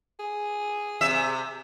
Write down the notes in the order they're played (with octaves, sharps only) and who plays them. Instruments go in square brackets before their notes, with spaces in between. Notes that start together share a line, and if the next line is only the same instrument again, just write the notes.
[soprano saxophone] G#4
[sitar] C3 E5